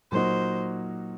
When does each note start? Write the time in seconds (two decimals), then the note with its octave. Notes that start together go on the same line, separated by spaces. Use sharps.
0.12 A#2 F#3 A#3 D#4 F#4 C5